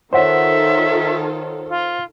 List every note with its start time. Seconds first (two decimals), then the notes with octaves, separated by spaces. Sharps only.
0.13 D#3 F4 A4 C5 C#5 E5 F#5
1.69 F4